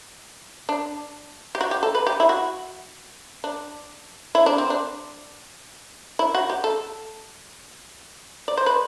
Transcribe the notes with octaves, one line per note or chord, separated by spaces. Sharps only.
D4
G4
F#4
G4
A4
B4
G4
E4
F#4
D4
E4
D4
C4
D4
E4
F#4
G4
A4
D5
C5
B4